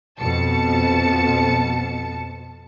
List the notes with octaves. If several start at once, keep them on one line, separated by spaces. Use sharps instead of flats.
F2 B2 A5 C#7